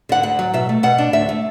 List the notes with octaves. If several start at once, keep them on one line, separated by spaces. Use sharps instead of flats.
D3 F#5
D2 F#5
F#3
B2 E5
A3
B2 F#5
D4
D2 E5
A3